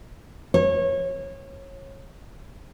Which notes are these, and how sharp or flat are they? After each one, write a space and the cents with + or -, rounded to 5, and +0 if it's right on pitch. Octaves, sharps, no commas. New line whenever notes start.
C#5 -25